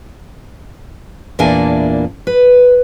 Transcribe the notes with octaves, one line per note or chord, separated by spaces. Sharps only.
E2 A#2 A#3 D4 E4 G#5
B4